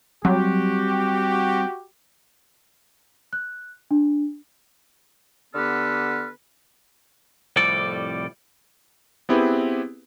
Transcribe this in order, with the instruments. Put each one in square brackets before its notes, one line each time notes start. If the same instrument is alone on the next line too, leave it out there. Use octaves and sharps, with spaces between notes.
[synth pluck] F#3 [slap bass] G3 C4 [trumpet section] F#4 G4
[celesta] F#6
D4
[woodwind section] D3 B3 G4 A4 B4 F6
[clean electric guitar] C2 F2 A2 G3 A4 D5
[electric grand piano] B3 C4 E4 G4 G#4 B4